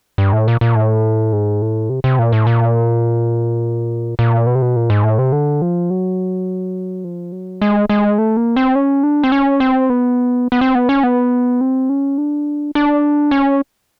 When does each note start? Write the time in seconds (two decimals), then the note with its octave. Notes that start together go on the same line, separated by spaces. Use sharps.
0.18 G2
0.33 A2
0.48 A#2
0.61 A#2
0.75 A2
1.33 G#2
1.62 A2
1.90 C3
2.04 C3
2.19 A#2
2.32 A2
2.47 A#2
4.19 A#2
4.46 B2
4.55 C3
4.62 B2
4.76 A#2
4.90 G#2
5.03 A2
5.18 C3
5.32 D3
5.62 F3
5.90 F#3
7.04 F3
7.32 F#3
7.62 G#3
7.89 G#3
8.18 A3
8.37 A#3
8.56 C4
8.75 C#4
9.03 D4
9.23 C4
9.32 C#4
9.60 C4
9.90 B3
10.52 B3
10.61 C4
10.75 B3
10.89 C#4
11.03 B3
11.61 C4
11.89 C#4
12.18 D4
12.75 D4
13.31 C#4